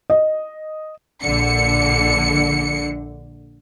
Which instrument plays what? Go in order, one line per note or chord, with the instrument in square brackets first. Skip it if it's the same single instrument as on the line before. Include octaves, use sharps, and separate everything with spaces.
[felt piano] D#5
[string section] A#1 D3 C#7